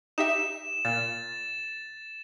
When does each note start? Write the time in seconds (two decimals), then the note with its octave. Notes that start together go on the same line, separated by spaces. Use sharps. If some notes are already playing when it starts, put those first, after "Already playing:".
0.18 D#4 G4 E5 E7
0.85 A#2 A6